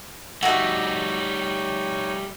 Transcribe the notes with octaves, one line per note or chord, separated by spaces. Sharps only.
G3 A3 D#4 F#4 C#5 D#5 E5